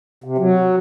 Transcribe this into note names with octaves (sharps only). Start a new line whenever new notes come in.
C3
F#3